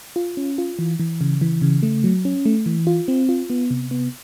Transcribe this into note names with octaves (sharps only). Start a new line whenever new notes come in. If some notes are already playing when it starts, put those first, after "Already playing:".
F4
C#4
F4
E3
E3
C#3
E3
C#3
A3
F#3
C#4
A3
E3
F4
C4
F4
B3
C3
B3